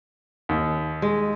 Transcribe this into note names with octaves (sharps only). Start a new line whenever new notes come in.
D#2
G#3